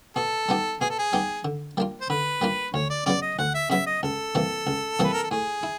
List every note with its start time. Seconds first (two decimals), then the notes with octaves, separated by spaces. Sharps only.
0.16 B2 A4
0.49 G3 B3 D#4 G4
0.81 B2 G#4
0.90 A4
0.99 G#4
1.13 G3 B3 D#4 G4
1.45 D3
1.77 G3 A#3 D4 F4
2.01 C5
2.10 D3 B4
2.41 G3 A#3 D4 F4
2.74 D2 C#5
2.90 D5
3.06 C#3 F#3 B3 D5
3.22 D#5
3.38 D2 F#5
3.54 E5
3.70 C#3 F#3 B3 E5
3.86 D#5
4.03 C#2 A4
4.35 C3 E3 G3 A#3
4.67 C#2
4.99 C3 E3 G3 A#3 B4
5.13 A#4
5.23 A4
5.31 A2 G#4
5.63 E4